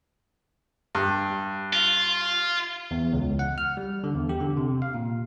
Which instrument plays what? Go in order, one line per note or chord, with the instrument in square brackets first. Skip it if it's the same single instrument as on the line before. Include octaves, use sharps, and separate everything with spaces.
[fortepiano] G2
[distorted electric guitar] F4
[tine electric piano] E2
C#2
F#5
F6
G3
D3
E2
G4
D3
C3
F5
A#2